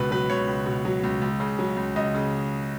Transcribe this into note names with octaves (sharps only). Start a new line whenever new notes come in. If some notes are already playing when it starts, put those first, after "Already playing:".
Already playing: C#2 B2 B4
F#3 B4
C#2 C#5
C#2
B2
F#3
C#2
C#2
C#3
F#3
C#2
C#2 D#5
C#3